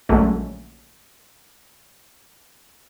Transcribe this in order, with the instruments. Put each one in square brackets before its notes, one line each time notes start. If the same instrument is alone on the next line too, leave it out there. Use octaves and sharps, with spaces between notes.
[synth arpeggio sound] A#1 D3 F#3 G#3 A3 C#4